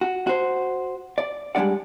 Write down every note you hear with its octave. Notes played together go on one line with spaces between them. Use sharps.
F#4
F#4 C5
D5
G3 G#3 D4 D5 F#5